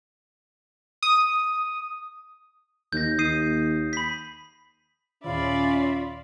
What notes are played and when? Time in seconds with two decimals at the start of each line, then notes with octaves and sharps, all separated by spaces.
1.03 D#6
2.93 D#2 G6 A#6
3.19 D#2 D#6 C7 D#7
3.93 B5 B6
5.24 D#2 A#2 D#3 C#4 F4 D5 E5 B5